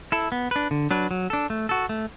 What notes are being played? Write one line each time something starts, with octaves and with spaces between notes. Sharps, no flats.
E4 A4
B3
D4 B4
D3
F#3 D4 B4
F#3
D4 A4
A3
F#4 A4
A3